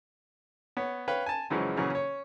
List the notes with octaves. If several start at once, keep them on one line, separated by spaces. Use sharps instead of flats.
B3 C#5
B4 C#5 F5 G5
G#5 A5
F#2 C#3 E3 F3 G#3
A#2 C#3 E3 F#3 G#4
C#4 C#5